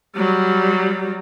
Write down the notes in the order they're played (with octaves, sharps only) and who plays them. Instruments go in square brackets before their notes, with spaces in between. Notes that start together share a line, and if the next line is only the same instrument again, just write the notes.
[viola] F#3 G3